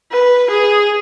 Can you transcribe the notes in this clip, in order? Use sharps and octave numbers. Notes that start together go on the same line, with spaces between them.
B4
G#4